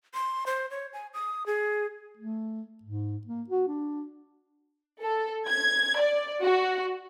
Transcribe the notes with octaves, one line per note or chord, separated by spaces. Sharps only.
C6
C5
C#5
G#5
D#6
G#4
A3
G#2
A#3
F#4
D4
A4
G#6
D5
F#4